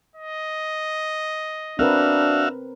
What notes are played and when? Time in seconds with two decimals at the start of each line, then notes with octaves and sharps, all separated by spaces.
0.16 D#5
1.79 C4 D4 F#4 A#4 B4 E5 F5